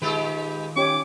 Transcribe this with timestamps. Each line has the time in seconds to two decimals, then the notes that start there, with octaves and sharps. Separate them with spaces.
0.02 D#3 G#3 D#4 F4 G4 B4
0.76 C#4 G4 C#5 D6